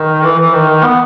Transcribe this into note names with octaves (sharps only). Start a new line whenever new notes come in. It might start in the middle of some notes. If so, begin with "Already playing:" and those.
Already playing: D#3
E3
E3
D#3
D#3
B3